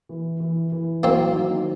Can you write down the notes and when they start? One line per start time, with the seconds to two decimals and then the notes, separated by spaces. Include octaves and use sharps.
0.09 E3
0.40 E3
0.72 E3
1.03 F#3 A#3 C4
1.35 D#3